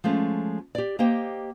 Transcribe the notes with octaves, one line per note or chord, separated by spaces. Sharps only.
F3 G#3 A3 C#4
G4 D5
A#3 G4 C5 D#5 G5